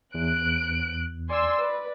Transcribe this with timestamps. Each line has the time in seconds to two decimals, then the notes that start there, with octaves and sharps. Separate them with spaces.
0.14 E2 F#6 D7
1.30 D5 G#5 C6 E6
1.60 B4